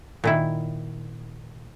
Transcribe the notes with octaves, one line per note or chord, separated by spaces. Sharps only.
A#2 D#3 E4